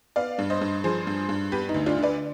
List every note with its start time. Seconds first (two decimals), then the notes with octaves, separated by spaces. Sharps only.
0.16 B3 D5 F5
0.39 G2
0.50 C5 D#5
0.61 G2
0.84 F3 G#4 C5
1.07 G2
1.29 G2
1.52 B3 G4 B4
1.69 D#4
1.74 D2
1.86 D4 F4
1.97 D3
2.03 B4 D5